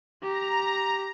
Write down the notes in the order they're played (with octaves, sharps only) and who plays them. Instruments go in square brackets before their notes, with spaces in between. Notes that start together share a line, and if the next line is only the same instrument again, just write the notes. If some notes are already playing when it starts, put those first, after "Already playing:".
[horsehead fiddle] G4 [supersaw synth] A#5